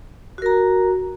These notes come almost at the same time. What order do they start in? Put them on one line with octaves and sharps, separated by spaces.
F#4 A#4 A#5